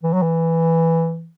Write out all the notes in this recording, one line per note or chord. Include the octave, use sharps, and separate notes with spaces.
E3
F#3
E3